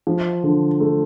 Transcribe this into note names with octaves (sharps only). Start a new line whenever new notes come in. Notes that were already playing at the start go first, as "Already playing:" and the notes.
F3
D3
A3